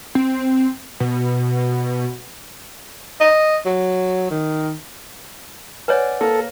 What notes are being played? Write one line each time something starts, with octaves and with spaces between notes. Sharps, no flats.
C4
B2
D#5
F#3
D#3
B4 C#5 D5 F#5 G#5
A#3 A4